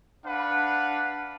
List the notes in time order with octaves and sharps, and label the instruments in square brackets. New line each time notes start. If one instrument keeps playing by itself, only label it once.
[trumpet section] D4 B4 F5 F#5